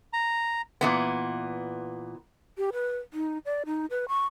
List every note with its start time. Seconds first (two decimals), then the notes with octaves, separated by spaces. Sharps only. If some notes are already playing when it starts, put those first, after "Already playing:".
0.13 A#5
0.81 A#2 E3 B3
2.58 G4
2.73 B4
3.14 D#4
3.45 D5
3.66 D#4
3.90 B4
4.08 C#6